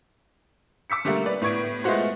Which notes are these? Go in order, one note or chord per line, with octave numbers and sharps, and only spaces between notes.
D6 E6 B6 C#7
D3 G3 A3 A#3
B4 D5
A2 B3 C#6 G#6 D7
G#3 A3 B3 F4 F#4 C5